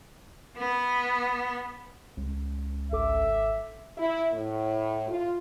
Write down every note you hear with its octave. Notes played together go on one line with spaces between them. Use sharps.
B3
C#2
G#1 A4 E5 D6
E4
A2
F4